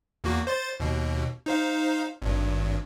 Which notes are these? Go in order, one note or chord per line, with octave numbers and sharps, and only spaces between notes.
E2 A#3 F#4
C5 C6 A6
D#2 B2
D#4 C5 F5
G#1 G2